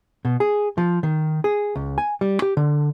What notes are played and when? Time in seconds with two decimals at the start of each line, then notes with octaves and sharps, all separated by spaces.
0.25 B2
0.40 G#4
0.78 F3
1.03 D#3
1.44 G#4
1.76 C#2
1.98 G#5
2.21 G3
2.42 G4
2.57 D3